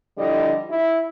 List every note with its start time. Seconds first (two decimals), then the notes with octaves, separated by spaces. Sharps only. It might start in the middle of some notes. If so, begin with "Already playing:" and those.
0.17 D3 F3 G3 E4 D5 D#5
0.69 E4